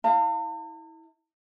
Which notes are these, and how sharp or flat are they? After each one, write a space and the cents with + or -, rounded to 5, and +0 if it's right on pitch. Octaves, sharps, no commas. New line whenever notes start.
E4 -25 F5 +0 A5 +45